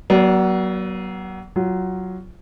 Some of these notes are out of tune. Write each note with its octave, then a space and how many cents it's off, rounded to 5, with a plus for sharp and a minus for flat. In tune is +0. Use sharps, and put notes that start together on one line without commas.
F#3 +25 B3 -45 D5 -15
F#3 +10 F4 +0